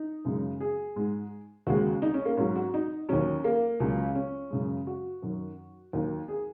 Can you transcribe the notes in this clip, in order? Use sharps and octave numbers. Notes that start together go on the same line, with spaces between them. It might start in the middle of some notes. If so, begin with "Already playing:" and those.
Already playing: D#4
F#2 C#3 G#3
G#4
G#2 G#3
D#2 C#3 G#3 F#4
D#4
C#4
A#3
G#2 F#3 C#4
F#4
D#4
D#2 D#3 F#3 C#4
A#3
C#2 C#3 F#3
C#4
F#2 C#3 G#3
F#4
F#2 D#3 F#3
D#2 D#3 F#3
G#4